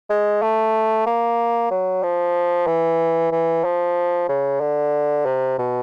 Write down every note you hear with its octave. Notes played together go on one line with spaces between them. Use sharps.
G#3
A3
A#3
F#3
F3
E3
E3
F3
C#3
D3
C3
B2